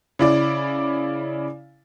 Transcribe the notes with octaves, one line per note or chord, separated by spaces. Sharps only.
C#3 E4 D5